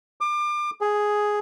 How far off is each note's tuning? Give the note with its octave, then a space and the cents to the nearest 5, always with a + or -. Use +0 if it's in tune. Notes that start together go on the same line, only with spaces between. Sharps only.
D6 +30
G#4 +5